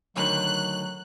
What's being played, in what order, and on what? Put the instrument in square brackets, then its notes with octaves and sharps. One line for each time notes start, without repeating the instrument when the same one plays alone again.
[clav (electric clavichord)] D2 D#3 [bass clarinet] F#3 [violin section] F#6